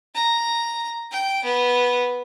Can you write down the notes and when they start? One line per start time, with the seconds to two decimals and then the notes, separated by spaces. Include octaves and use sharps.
0.15 A#5
1.11 G5
1.44 B3